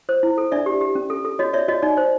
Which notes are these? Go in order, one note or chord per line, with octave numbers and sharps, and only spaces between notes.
C5
E4
A4
D4 D5 E5
G4
G4
C#4
A4
A4
F#4 C#5 D#5
C#5 D5 E5
F#4 C#5 D#5
D#4 D5
C5